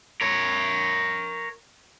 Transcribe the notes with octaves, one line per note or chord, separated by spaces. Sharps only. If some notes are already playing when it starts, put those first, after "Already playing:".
A#4 C#5